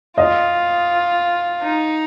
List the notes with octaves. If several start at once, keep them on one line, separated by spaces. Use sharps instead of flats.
F4 D#5
D#4